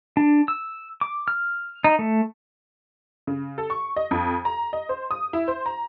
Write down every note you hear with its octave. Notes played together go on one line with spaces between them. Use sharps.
D4
E6
D6
F6
D#4
A3
C#3
A4
C#6
D#5
F2
A#5
D#5
C5
D#6
E4
C5
A#5